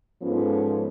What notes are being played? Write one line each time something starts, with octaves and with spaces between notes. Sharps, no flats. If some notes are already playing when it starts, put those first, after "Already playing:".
G#2 F3 B3 C#4 F4 A4